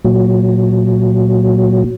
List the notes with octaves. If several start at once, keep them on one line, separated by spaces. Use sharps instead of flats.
A#2 F#3